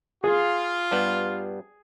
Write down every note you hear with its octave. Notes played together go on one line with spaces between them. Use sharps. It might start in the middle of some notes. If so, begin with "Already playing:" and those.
F4 G#4
G2 G3 B3